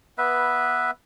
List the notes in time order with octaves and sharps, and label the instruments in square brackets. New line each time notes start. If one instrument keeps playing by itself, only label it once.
[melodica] B3 B4 E5